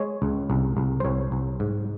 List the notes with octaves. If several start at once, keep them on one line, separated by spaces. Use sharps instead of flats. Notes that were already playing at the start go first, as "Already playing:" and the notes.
Already playing: G#3 C#5
C#2
C2
C2
C5
C2 C#5
C2
G#2